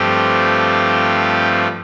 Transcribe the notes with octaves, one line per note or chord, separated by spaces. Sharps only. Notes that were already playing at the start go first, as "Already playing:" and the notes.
Already playing: G2 F3 A3 C4 G4